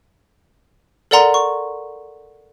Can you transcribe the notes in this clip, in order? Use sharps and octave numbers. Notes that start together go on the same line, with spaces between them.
A4 A#4 D5 F#5 A#5 C6
C#6